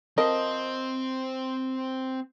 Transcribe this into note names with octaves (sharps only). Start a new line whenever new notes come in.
F3 C4 A#4 C5 D#5